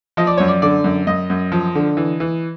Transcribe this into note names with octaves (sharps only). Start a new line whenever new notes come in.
F3 D#5
D5
F#2 C#5
D5
D3 D5
F#2
F#2 D#5
F#2
F3
D3
E3
E3